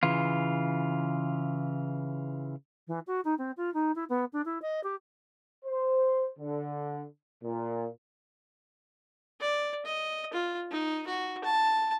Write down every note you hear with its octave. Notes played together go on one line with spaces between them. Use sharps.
C#3 E3 F4
E3
F#4
D#4
C4
F4
D#4
E4
B3
D4
E4
D#5
G4
C5
D3
A#2
D5
D#5
F4
D#4
F#4
A5